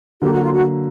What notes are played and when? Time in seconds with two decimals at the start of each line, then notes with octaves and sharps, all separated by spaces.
0.21 D3 F#3 A#3 G4
0.32 F#4
0.41 F4
0.52 F#4